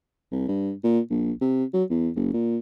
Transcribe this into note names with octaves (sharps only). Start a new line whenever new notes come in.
C2
G2
A#2
A#1
C3
F#3
E2
F#1
A#2